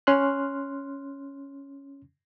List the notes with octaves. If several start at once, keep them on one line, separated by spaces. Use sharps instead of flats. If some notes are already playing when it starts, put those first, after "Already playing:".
C#4 C6 F6 F#6